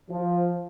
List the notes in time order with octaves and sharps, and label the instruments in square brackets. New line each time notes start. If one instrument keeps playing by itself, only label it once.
[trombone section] F3